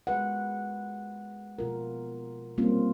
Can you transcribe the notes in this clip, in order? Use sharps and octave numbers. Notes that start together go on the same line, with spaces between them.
G#3 B4 F#5
B2 F4 A#4
G3 A#3 C4 C#4 F4